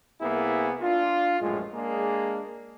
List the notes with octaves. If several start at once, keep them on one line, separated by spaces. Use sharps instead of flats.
C2 A#3 B3 E4 G#4
D4 F4
A#1 F#2 A2 G#3
G#3 A#3 D4 G#4